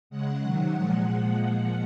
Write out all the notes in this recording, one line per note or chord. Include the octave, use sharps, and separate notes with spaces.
C#3 G#3 F#5
C3 D#3 F#3 F#5
A#2 F3 G#3